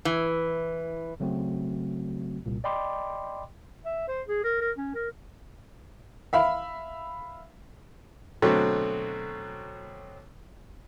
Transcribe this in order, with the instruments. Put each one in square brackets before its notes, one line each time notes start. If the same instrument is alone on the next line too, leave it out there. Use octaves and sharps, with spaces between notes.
[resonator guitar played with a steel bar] E3
[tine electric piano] C#3 F#3 A3 C4 F#4
C2 A#2
D5 D#5 G5 B5 C6 D6
[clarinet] E5
C5
G#4
A#4
A#4
C#4
A#4
[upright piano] E5 F5 B5
[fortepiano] B2 D3 F#3 A3 C4